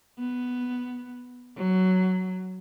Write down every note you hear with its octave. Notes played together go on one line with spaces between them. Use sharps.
B3
F#3